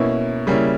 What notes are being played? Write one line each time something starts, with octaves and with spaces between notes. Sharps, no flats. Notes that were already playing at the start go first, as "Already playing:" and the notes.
Already playing: B2 A#3 C#4 E4
C#3 G3 A#3 C#4 E4